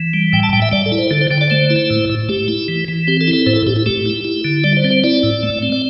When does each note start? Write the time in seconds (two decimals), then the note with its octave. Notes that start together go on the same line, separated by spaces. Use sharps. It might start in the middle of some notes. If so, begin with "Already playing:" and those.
Already playing: E3
0.14 G3
0.33 A2 G5
0.43 A5
0.53 A2 G5
0.62 E5
0.72 G3 D5
0.86 A4
0.92 E4
0.98 C5
1.11 D3 A4
1.21 C5
1.31 D3 G5
1.41 D5
1.50 A3 C5
1.70 E4
1.90 A2
2.10 A2
2.29 A3 G4
2.48 E4
2.68 E3
2.88 E3
3.07 C4 G4
3.21 A4
3.28 E4
3.33 A4
3.46 A2 C5
3.56 A4
3.66 A2 G4
3.76 E4
3.86 A3 G4
4.06 E4
4.24 E4
4.45 D3
4.64 G3 D5
4.77 C5
4.84 C4
4.90 C5
5.04 E4 D5
5.23 A2
5.43 A3
5.63 C4
5.72 D5